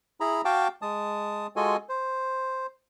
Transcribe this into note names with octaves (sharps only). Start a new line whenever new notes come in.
E4 G#4 A#5 B5
F#4 F5 G5 A5 D6
G#3 A5 D#6
G#3 F4 F#4 A4 D#5 G#5
C5